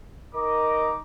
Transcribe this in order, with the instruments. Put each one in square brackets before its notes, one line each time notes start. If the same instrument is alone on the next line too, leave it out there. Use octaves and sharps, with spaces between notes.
[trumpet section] D#4 A#5 D6 [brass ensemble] A#4 D#5